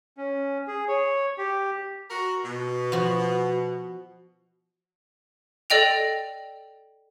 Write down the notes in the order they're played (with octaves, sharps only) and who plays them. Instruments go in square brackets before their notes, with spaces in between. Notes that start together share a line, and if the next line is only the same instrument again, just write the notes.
[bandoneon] C#4
G#4
C#5
G4
[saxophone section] F#4 A#4
B2
[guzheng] F3 F#4
[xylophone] A4 D5 D#5 G5 F7